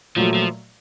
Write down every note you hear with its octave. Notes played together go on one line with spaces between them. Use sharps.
A#2 F3 F#3 A3
F3